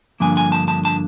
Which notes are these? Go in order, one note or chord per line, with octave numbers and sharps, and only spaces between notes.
G2 D3 F3 A#3 G#5
G#5
A5
A5
A5